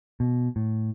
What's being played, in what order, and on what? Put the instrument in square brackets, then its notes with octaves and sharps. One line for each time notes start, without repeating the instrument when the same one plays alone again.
[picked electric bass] B2
A2